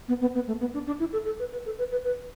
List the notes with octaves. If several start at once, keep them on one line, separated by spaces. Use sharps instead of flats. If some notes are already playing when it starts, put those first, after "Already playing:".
B3
B3
B3
A3
B3
D4
D4
E4
A4
A4
B4
B4
A4
B4
B4
B4